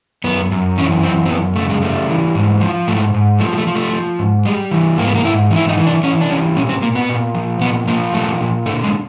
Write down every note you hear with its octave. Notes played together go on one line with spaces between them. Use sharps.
F#2 B3
F#2
E3 C#4
F#2 C4
C4
F#2 B3
C#3 A3
G#3
G3 A3
E3
G#2
F3
G#2 A3
G#2
F3 A3
G#3
A3
F3
A3
F3
G#2
G3 G#3
E3
G#2 A#3
B3
A#3
G#2 E4
E3
E4
D#4
E3
D4
E3 C#4
D4
G3 C#4
A#2 C#4
C4
A#2 A#3
B3
A#2
F3
A#2 B3
F3 A#3
A#2 A3
A#2
D3 A3
G#3